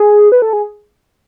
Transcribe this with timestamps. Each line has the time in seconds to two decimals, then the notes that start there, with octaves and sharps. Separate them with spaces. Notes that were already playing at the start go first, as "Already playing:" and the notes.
Already playing: G#4
0.32 B4
0.42 A4
0.53 G#4